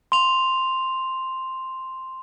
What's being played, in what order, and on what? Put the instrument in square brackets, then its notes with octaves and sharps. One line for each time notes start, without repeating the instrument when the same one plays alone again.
[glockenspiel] C6 F7